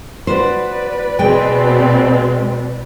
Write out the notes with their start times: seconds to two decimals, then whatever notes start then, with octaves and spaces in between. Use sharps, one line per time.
0.27 F#4 B4 C5 D5
1.19 B2 G#3 C4 G5